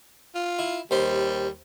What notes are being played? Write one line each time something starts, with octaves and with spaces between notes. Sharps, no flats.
F4
E4
D#2 G3 C5